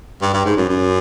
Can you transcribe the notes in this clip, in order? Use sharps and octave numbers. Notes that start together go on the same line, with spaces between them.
G2
G2
G#2
F#2
F#2